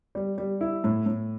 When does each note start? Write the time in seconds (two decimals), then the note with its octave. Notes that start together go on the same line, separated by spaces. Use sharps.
0.15 G3
0.38 G3
0.61 E4
0.84 A2
1.06 A2